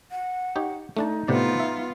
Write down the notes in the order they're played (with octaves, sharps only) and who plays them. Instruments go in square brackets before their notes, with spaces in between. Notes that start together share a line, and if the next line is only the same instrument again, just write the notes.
[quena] F#5
[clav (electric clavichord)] D#4 G4 C#5
[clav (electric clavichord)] A3 D4 A5 [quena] D#4
[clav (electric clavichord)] A2 C3 D5 [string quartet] B3 F4
[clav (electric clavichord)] E5